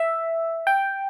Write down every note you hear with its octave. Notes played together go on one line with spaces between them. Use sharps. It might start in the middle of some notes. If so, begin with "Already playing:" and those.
Already playing: E5
G5